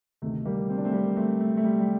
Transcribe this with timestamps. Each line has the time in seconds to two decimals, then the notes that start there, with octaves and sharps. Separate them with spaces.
0.22 D2 C3 D#3 A3
0.45 G3 A#3
0.69 C4
0.77 D4
0.85 A3 C4
0.93 G3 A#3
1.16 A3 C4
1.40 A3
1.57 A3
1.64 G3
1.79 G3